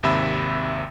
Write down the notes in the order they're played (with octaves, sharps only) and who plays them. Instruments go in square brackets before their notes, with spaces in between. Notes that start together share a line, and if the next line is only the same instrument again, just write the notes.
[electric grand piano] G#1 D#2 C3 E5 B5 E6